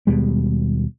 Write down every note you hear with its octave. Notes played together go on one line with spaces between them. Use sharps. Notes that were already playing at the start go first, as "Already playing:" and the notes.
D#2 B2 G3 G#3